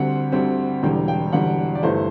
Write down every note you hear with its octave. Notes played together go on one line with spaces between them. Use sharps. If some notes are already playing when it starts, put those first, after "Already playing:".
Already playing: D2 D3 G3 C4 F#5
D2 D3 G3 C4
E1 E2 D3 G3 G5
G5
E1 E2 D3 G3 F#5
D5
G1 G2 E3 A3 C5